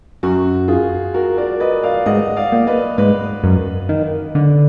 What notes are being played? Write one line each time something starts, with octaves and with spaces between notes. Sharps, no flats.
F#2 F#4
F4 G#4
F#4 A#4
A#4 D5
B4 D#5
D5 F5
G#2 D#5 F#5
D5 F5
A#2
B4 D#5
G#2 B4 D#5
F#2
D#3
D3